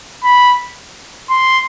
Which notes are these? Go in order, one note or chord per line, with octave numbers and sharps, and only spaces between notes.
B5
C6